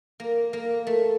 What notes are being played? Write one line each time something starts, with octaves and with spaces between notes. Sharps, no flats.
A#3
A#3
A3